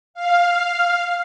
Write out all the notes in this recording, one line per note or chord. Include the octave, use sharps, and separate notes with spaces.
F5